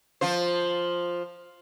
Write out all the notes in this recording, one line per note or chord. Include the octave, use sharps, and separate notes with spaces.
F3 F4 C5